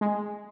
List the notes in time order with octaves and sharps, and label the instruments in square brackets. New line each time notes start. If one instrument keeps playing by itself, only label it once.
[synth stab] G#3